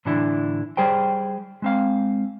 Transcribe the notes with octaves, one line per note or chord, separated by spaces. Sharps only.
A2 D3 E3 D4 E4
G3 G#4 C5 G5
G#3 C4 F5